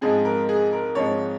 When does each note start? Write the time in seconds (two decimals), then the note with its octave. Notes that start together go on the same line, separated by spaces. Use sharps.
0.01 G#2 F3 G#3 C4 G#4
0.25 A#4
0.49 G#4
0.73 A#4
0.95 G#2 F3 G#3 C4 C#5